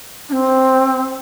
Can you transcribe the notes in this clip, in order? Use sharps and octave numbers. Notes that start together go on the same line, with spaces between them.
D4
C4